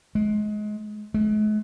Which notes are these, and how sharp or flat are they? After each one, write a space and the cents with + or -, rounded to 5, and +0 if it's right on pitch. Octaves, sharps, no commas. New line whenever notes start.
G#3 +25
G#3 +45